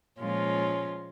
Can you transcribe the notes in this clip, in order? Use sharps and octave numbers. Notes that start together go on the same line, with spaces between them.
A#2 F3 G#3 C#4 F4